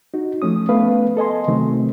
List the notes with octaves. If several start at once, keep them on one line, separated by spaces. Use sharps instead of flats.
D#4 F#4
F3 A3 C#4 D#6
A3 B3 B4 F5
A4 D#5 G#5 C6
C3 D#3 F#3 A3 C4